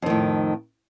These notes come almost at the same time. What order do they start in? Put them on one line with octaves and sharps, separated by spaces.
F2 D#3 A2